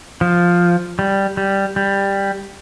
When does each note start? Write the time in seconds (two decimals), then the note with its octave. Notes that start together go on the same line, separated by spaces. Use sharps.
0.21 F3
0.99 G3
1.37 G3
1.76 G3